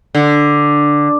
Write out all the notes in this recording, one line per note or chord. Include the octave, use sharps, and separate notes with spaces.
D3